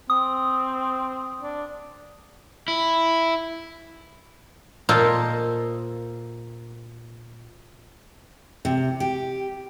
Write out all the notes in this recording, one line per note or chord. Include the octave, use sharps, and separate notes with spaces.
C4 D#6
D4
E4
A#2 F4 A4 A#4 C5 D#5
C3
G4